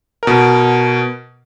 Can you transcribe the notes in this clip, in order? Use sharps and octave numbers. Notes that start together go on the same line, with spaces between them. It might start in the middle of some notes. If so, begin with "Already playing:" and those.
B2 A#4